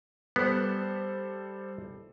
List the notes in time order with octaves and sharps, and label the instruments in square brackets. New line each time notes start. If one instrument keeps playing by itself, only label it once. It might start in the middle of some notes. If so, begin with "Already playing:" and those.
[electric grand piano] G3 A4 C5 [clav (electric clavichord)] B3